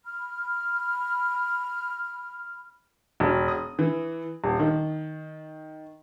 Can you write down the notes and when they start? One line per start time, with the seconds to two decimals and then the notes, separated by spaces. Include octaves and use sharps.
0.05 B5 F6
3.20 E1
3.48 D#6
3.79 E3
4.44 D#1
4.59 D#3